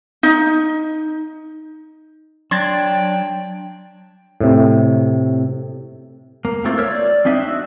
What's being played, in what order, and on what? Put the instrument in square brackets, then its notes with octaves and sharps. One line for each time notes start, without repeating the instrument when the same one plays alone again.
[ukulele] D#4
[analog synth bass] F#3 [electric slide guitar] D4 [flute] G5 [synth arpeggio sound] C6 G#6 A6
[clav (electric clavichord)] A2 C3
[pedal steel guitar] A#3
A3 A#3 C4 E4 F4
A#4 C5 C#5 E5 E6
D5
C4 D4 D#4 E5
F#4 E5